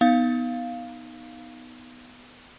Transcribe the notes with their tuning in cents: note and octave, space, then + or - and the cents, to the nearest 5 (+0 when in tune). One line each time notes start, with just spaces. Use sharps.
B3 +0 D#4 +0 F5 +0